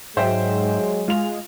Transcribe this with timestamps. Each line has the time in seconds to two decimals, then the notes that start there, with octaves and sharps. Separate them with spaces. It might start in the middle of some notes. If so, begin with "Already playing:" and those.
0.17 G#2 F#3 G#3 C5 E5 G5
1.08 G#3 F4 F7